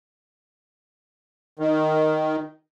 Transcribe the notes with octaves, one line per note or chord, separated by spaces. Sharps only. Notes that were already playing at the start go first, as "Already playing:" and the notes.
D#3